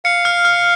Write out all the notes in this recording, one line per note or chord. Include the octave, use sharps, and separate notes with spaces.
F5 C#7
F6
F6